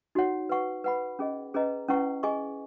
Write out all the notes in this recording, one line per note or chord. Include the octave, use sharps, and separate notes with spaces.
D#4 F#4 C#5 F#5
B4 F#5 C#6
B4 F#5 B5
C#4 G#4 D#5
C#4 G#4 B4 D#5 A#5
C#4 E4 B4 F#5 C#6
G#4 D#5 G#5 C#6